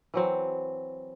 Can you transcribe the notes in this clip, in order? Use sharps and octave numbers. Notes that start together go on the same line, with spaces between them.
E3 F#3 C4